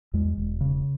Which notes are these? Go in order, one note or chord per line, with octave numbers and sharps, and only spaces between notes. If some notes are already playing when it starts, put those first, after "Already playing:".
E2 G#3
E1
C#3